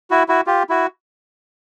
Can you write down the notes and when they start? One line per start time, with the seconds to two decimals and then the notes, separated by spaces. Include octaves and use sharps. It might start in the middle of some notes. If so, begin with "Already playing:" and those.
0.11 E4 F#4
0.29 E4 F#4
0.46 F4 G4
0.69 E4 F#4